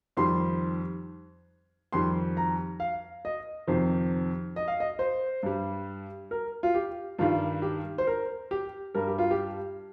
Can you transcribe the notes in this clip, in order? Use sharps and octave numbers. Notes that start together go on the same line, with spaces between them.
F2 D#3 G3 C6
F2 D#3 G3 C6
A#5
F5
D#5
F2 C3 D#3 C5
D#5
F5
D#5
C5
G2 G3
A#4
F4
G4
G2 D#3 G3 F4
G4
C5
A#4
G4
G2 G3 A#4
G4
F4
G4